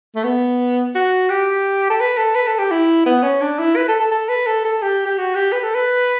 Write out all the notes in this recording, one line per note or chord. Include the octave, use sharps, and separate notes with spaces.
A3
B3
F#4
G4
A4
B4
A4
B4
A4
G4
E4
B3
C#4
D4
E4
B4
A4
A4
A4
B4
A4
A4
G4
G4
F#4
G4
B4
A4
B4